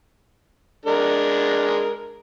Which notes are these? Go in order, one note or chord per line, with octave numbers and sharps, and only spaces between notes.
G#3 D4 A#4